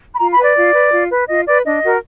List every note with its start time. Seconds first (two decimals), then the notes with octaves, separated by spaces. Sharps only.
0.14 B5
0.19 F4 A#5
0.32 B5
0.37 B4
0.44 D5
0.55 F4
0.74 B4
0.92 F4
1.10 B4
1.28 F4 D#5
1.46 B4 D5
1.64 D4 D#5
1.82 F#4 A#4